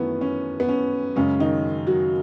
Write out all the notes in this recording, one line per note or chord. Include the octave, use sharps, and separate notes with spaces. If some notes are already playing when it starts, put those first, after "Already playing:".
Already playing: F#2 D#3 E3 A3 B3 C#4 E4
C#4
B3
C#4
F#2 C#3 G#3 C#4
D#3 D#4
F#3 F#4